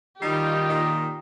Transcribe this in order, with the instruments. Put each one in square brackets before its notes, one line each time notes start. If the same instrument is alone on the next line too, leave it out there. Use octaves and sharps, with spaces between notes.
[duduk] D#3 [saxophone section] G3 D#4 [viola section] F4 G4 [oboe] D#5
[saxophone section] A#2 D#4